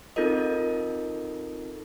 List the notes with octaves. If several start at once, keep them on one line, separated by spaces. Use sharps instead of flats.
C4 D#4 F4 A4 A#4 D#5